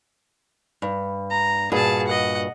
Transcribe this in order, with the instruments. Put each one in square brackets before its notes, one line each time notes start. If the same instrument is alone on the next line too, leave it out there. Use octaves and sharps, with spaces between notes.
[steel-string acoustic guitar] G2
[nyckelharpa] A#5
[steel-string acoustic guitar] G2 A#2 F#4 [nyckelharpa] G#4 A5
[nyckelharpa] D#5 F#5